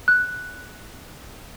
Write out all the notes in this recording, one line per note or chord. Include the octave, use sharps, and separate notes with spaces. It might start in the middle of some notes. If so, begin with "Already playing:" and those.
F#6